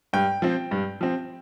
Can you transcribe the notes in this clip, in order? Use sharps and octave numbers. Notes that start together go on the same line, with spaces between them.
G2 G5
F3 C4
G2
F3 C4